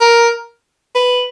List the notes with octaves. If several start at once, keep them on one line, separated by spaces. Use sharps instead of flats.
A#4
B4